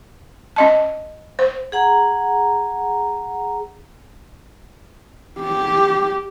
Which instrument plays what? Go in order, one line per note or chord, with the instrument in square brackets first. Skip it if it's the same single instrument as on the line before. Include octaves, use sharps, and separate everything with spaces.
[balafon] C#4 D#5 A5
C5
[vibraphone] G#4 F#5 A#5
[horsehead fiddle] G4